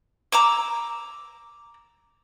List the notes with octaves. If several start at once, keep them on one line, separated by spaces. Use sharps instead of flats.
A#5 D6 E6